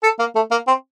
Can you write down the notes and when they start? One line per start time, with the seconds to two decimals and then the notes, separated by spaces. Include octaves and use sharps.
0.03 A4
0.19 A#3
0.35 A3
0.51 A#3
0.67 C4